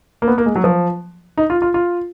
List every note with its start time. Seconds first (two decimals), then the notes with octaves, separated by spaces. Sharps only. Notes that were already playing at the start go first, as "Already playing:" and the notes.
0.22 A#3
0.28 B3
0.38 A#3
0.46 G#3
0.56 F#3
0.64 F3
1.37 D#4
1.50 F4
1.62 F4
1.74 F4